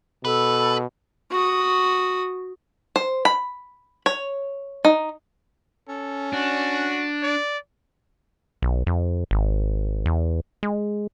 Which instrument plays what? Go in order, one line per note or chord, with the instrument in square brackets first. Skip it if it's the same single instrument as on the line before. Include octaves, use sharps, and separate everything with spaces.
[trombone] B2 [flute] A4 [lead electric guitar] B4
[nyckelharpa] F#4 D#6
[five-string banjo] C5
B5
C#5
D#4
[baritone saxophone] C#4 [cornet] A4
[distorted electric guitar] D4 [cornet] F#4
[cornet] D5
[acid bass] B1
F2
G#1
E2
G#3